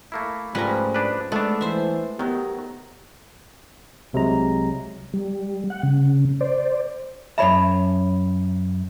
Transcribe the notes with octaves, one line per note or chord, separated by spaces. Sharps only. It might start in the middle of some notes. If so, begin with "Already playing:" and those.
A3 A#3 E4
G#2 F3 G3 A3 C#4 A#4 B4 A#5
D4 G#4 B4
G#3 A3 B3 D4 A4
E3 C5 E5
D#3 F#3 B3 G4
C2 C3 F#3 G#3 A#5
G3
F#5
C#3
C5 D5
F#2 C#5 E5 A5 B5